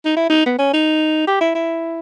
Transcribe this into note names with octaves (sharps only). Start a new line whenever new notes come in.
D#4
E4
D#4
B3
C#4
D#4
G4
E4
E4